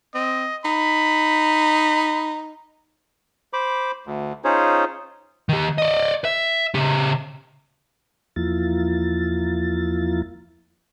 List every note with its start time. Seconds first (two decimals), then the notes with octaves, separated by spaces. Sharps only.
0.15 C4 D#5
0.65 D#4 B5
3.53 C5 B5 D6
4.06 D2
4.44 C#4 D#4 F4 G#4 C5 C#5
5.49 D#3 G4
5.78 D5 D#5
6.25 E5
6.74 C#3 G4
8.36 E2 F3 A#3 E4 F4 A6